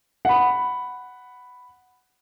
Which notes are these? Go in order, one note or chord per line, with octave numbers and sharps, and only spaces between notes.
F#5 B5